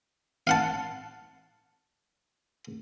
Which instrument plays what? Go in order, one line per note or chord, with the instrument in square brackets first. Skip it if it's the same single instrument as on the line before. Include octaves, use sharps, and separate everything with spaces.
[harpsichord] F5 F#5 A5